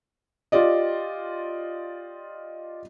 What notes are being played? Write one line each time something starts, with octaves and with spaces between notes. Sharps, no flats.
F4 G4 D5 D#5